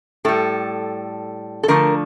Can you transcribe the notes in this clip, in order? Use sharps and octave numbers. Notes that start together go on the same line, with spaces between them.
A2 G3 A4
A4
D3 F3 A3 A#4